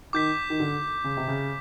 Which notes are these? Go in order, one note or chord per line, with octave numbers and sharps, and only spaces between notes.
D#3 D6 G6 B6
D#3
D3
C#3
C3
C#3